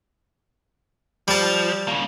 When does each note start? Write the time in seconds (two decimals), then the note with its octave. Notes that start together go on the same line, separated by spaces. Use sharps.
1.28 F3 G3 A5
1.88 C#3 A#3